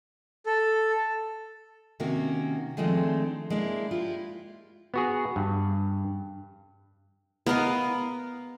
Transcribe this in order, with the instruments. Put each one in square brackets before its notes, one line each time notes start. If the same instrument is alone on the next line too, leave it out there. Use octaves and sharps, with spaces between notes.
[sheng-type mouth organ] A4
[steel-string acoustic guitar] C3 D#3 A#3 C#4 F#4
D#3 F3 G#3 A3 C4 D4
G#3 A#3 D4 E4
E4 F4 G4
[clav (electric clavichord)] B3 F#4 G#4
G2
[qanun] B3 A#4 D#5 F5